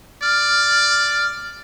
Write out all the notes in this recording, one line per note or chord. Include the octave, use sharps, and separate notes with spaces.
D5 F6